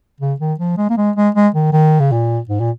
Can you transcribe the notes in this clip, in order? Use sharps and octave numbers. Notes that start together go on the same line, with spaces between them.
C#3
D#3
F3
G#3
A#3
G#3
G#3
G#3
D#3
D#3
C#3
A#2
G#2
A#2